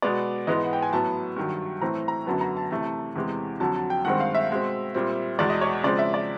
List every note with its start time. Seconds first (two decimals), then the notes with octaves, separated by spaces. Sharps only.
0.02 B2 G#3 B3 D5
0.47 G#2 E3 G#3 B3 D#5
0.64 F#5
0.73 G5
0.82 G#5
0.92 A2 F#3 B3 A5
1.37 G2 D#3 F#3
1.81 A2 E3 A3 C4 A#5
2.08 A#5
2.26 F#2 D3 F#3 B3 A5
2.41 A#5
2.57 A5
2.71 C3 E3 A3 A5
3.16 E2 C3 E3 G#3
3.60 F2 D3 F#3 A5
3.75 A5
3.90 G5
4.05 G2 D#3 G#3 C4 F#5
4.20 F5
4.35 E5
4.50 B2 G#3 C4
4.94 A#2 G3 C4
5.39 E2 B2 G#3 D5
5.50 D#5
5.61 C#5
5.83 C#3 F3 G#3 C4 D5
5.99 E5
6.14 D5